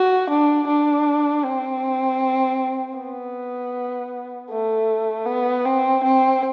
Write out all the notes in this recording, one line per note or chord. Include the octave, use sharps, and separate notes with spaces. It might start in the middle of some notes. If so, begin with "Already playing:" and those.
Already playing: F#4
D4
D4
C4
B3
A3
B3
C4
C4